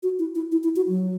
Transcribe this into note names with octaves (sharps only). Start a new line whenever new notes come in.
F#4
E4
E4
E4
E4
F#4
F#3